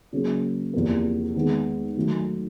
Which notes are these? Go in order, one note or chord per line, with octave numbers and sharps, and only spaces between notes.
C#3 F#3 A#3
E2 C3 F3 A#3
D#3 G#3 B3
D#3 F#3 A3